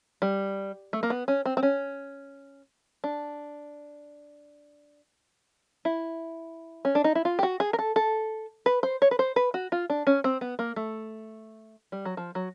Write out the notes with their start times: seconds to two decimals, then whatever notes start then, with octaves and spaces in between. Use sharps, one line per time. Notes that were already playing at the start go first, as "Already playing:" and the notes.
0.22 G3
0.93 A3
1.03 A#3
1.10 B3
1.28 C#4
1.46 C4
1.57 C4
1.63 C#4
3.04 D4
5.85 E4
6.85 C#4
6.95 D4
7.04 D#4
7.15 E4
7.25 F4
7.39 G4
7.43 F#4
7.60 G#4
7.73 A#4
7.79 A4
7.96 A4
8.66 B4
8.83 C5
9.02 C#5
9.11 B4
9.19 C5
9.36 B4
9.54 F#4
9.72 F4
9.90 D4
10.07 C#4
10.24 C4
10.41 B3
10.59 A#3
10.76 A3
11.92 G3
12.05 F#3
12.17 F3
12.35 F#3